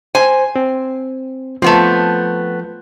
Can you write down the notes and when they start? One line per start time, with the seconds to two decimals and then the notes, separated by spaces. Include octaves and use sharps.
0.15 C5 G#5
0.56 C4
1.62 F3 A3 B3 C4